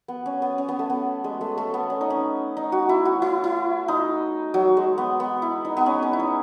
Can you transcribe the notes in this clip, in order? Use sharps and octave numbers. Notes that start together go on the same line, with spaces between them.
B3
C#4
B3
C#4
B3
A3
B3
G#3
A3
A3
B3
C#4
D#4
C#4
D#4
F#4
E4
F#4
E4
E4
D#4
F#3
G#3
B3
B3
E4
D#4
B3
C#4
C#4
E4
D#4